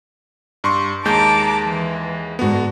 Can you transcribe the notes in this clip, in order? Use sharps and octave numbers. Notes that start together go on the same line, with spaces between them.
G2 C6 C#6
D#2 G#3 A5 A#5 D6 G6
E3
G#2 D3 B3 F#4